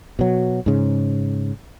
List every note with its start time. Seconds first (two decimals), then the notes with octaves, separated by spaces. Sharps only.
0.19 B2 F#3
0.66 G#2 C#3